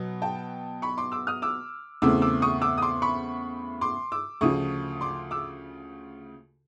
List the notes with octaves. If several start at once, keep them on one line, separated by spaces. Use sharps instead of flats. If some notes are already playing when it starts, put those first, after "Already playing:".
Already playing: B2 F#3 B3
G5 A5
B5 C#6
C6 D6
D6 E6
D#6 F6
D6 E6
E2 C#3 E3 A3 C4 D6 E6
D6 E6
C#6 D#6
D6 E6
D#6
C6 D6
B5 C#6
C6 D6
D6 E6
D2 C#3 F3 C#6 D#6
C6 D6
D6 E6